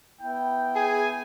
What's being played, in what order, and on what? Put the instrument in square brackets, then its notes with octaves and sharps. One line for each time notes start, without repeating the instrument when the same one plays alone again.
[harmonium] B3 E4 [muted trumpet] G5
[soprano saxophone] G#4 [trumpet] G#5